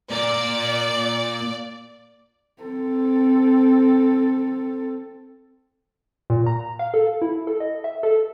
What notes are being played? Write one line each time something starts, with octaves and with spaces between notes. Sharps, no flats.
A#2 A#4 D5
C4 A4
A#2
A#5
F5
A4
E4
A4
D#5
E5
A4